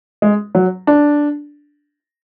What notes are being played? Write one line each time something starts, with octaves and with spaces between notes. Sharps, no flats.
G#3
F#3
D4